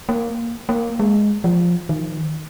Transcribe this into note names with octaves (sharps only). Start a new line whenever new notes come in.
A#3
A#3
G#3
F3
D#3